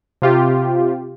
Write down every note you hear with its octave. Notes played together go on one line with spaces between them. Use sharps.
C3 F4 G4